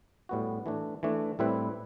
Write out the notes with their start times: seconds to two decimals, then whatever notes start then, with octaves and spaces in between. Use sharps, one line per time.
0.29 A2 G3 B3 F#4
0.66 E3 A3 D4
1.03 E3 A3 D4
1.39 A2 G3 C4 E4 B4